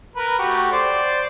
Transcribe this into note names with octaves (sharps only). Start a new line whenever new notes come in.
A#4 B4
A3 F#4 G4
C5 D5